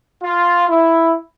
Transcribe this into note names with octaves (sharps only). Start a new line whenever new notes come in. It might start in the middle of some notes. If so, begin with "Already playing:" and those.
F4
E4